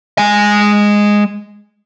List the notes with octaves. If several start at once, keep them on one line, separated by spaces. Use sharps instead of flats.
G#3 G#5